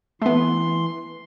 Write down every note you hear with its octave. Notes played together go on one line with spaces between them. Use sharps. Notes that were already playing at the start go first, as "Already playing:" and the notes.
E3 A3 B3 C6